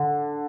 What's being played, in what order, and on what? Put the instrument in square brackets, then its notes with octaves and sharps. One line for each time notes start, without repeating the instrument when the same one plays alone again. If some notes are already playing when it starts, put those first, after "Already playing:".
Already playing: [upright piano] D3